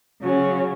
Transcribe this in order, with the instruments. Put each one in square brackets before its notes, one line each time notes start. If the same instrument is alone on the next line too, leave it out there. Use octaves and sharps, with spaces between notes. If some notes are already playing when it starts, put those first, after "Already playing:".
[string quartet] C#3 F#3 C#4